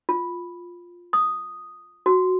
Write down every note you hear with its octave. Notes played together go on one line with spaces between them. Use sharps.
F4
D#6
F#4